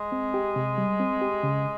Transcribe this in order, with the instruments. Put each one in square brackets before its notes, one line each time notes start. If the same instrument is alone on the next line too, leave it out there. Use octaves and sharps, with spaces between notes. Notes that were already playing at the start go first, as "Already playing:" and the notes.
Already playing: [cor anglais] G#3
[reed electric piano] C4
G4
C3
G3
C4
G4
C#3